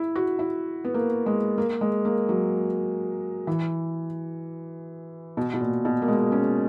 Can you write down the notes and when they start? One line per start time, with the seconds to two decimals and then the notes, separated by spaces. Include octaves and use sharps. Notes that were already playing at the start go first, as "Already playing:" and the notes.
Already playing: E4
0.16 F#4
0.39 E4
0.85 B3
0.94 A#3
1.26 G#3
1.58 A#3
1.81 G#3
2.05 A#3
2.29 F#3
3.47 E3
5.37 B2
5.54 B2
5.61 A#2
5.85 B2
6.02 A#3
6.08 G#3
6.32 C#4